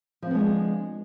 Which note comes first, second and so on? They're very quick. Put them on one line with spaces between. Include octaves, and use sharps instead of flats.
F3 C4 B3 G#3 D4